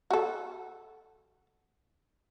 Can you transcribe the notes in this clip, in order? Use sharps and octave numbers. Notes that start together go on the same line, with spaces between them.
F#4 A4